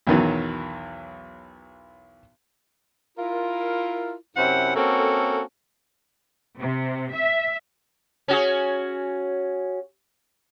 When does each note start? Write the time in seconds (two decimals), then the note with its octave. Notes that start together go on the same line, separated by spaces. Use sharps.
0.07 B1 E2 D#3 E3 F#3
3.18 E4 F4 A#4
4.36 F#2 C3 C#4 E4 C5 F#5
4.75 A#3 C4 C#4 F#4 A4
6.59 C3
7.13 E5
8.28 C#4 F#4 G#4